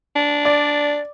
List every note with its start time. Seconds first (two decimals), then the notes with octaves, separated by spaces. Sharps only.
0.16 D4
0.45 D5